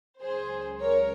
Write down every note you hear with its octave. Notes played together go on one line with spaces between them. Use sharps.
C#2 C#3 F#3 G#4 C5
A#4 C#5